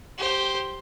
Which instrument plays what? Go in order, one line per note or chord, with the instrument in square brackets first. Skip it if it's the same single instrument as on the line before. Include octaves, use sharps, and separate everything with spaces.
[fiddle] G4 C5